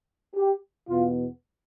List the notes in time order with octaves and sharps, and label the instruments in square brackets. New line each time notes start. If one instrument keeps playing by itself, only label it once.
[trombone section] G4
E2 B2 B3 F4